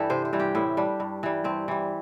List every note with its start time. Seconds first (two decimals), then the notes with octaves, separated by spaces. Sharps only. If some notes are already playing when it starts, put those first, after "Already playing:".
Already playing: G2 E3 G3 G4 A4
0.10 C3 C5
0.25 C5
0.33 E3 G3
0.40 G4
0.55 A2 E4
0.77 G3 D4
1.00 G2
1.23 E3 G3
1.44 G2 C4
1.68 E3 G3